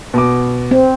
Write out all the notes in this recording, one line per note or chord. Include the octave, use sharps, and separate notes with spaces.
B2 D6
C4